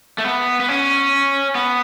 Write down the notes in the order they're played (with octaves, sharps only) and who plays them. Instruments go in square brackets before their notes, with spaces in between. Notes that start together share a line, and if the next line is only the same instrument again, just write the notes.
[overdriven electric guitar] A3
B3
B3
C#4
B3